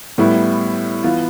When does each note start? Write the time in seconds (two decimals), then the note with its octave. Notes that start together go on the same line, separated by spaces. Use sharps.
0.18 A2 G3 B3 E4
1.04 E3 B3 F4